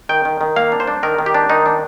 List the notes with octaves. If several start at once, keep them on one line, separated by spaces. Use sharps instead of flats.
D#3 G5
D#3
D#3
A#3 F5
D4
C5
D4
D#3 A#4
D#3
G4
D4
D#3 D#4
D4